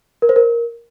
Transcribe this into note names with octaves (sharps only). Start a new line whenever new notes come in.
A#4
C5
A#4